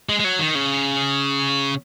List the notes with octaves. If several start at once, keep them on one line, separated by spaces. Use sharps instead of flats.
G#3
G#3
F#3
D#3
C#3